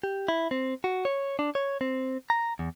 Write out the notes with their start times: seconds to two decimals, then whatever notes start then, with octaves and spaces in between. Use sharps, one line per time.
0.03 G4
0.28 E4
0.51 C4
0.84 F#4
1.05 C#5
1.39 D4
1.55 C#5
1.81 C4
2.30 A#5
2.59 E2